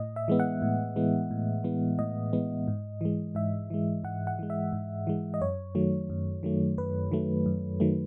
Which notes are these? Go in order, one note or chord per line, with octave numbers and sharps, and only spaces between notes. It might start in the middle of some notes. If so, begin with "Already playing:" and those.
Already playing: A2 D#5
E5
E3 G#3 B3
F#5
A2
E3 G#3 B3
A2
E3 G#3 B3
A2 D#5
E3 G#3 B3
G#2
E3 G#3
G#2 E5
E3 G#3
G#2 F#5
F#5
E3 G#3
E5
G#2
E3 G#3
D#5
F#2 C#5
D#3 F#3 A3
F#2
D#3 F#3 A3
F#2 B4
D#3 F#3 A3
F#2
D#3 F#3 A3